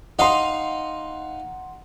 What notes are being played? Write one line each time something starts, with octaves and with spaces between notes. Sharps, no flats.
D#4 D#5 F5 F#5 C6